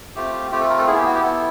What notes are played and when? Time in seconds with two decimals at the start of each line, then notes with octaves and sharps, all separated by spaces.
0.16 A3 C4 F4 G4
0.51 A3 C4 F4 G4
0.60 A4
0.70 A#4
0.78 A4
0.87 B3 E4 G#4
0.97 G4
1.05 F#4
1.14 G4
1.22 B3 E4 A4